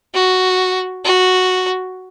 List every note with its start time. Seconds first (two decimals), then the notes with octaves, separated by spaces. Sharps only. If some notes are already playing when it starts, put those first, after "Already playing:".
0.14 F#4
1.05 F#4